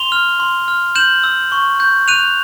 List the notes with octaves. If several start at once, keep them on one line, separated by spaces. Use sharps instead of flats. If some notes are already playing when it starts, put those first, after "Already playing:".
Already playing: C6 F7 G7
F6
C6
F6
G6 E7 F#7
E6
C#6
G6
F#6 D#7 F7